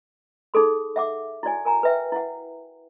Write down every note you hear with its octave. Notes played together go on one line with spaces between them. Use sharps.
D#4 G#4 A4 C6
E5 F#5 D6
E4 F#4 D5 G#5
A#4 G#5 A#5
B4 E5 G5
E4 F#5